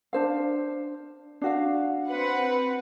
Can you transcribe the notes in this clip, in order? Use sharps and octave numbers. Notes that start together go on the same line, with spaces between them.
D4 C5 F5
D4 F#4 F5
C4 B4 F#5